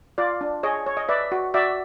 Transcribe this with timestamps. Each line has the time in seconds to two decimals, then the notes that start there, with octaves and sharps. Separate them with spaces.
0.18 F4 D5
0.41 D4
0.63 G#4 C#5 D#5
0.86 C#5
0.97 D#5
1.09 B4 D5 E5
1.32 F#4
1.54 F#4 D5 E5